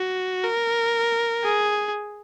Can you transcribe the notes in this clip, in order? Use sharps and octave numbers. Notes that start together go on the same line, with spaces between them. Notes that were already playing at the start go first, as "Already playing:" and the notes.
Already playing: F#4
A#4
G#4